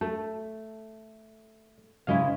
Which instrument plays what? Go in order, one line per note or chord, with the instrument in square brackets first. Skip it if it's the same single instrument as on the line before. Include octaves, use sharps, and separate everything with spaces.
[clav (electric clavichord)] A3 [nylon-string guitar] A4
[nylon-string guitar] G#2 C#3 G#3 [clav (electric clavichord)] E4 D#5 F5